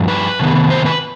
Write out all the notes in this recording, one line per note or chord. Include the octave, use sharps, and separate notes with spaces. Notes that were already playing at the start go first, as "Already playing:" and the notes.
Already playing: G2 F3
B4
C3 D#3 B3
C5
B4